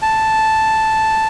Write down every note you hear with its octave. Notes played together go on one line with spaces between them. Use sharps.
A5